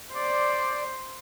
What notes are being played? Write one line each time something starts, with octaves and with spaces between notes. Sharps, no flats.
C5 D5